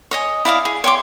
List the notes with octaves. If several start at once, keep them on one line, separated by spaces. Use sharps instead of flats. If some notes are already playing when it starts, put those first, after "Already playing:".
C#5 D#5 G#5
E4 D5 F5 D#6
G#4
C#5 G5 C6 D6